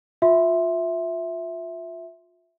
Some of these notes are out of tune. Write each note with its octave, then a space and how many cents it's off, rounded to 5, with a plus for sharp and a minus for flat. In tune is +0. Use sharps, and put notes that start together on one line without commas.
F4 +25 E5 +0 C6 +0